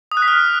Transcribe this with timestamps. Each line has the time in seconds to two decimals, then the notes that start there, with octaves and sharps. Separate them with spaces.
0.12 D#6
0.17 F#6
0.22 B6
0.28 F6